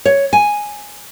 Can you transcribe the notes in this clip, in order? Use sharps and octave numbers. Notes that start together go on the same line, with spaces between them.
C#5
G#5